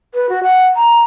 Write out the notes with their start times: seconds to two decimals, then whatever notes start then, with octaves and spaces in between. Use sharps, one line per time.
0.14 B4
0.29 F#4
0.43 F#5
0.76 A#5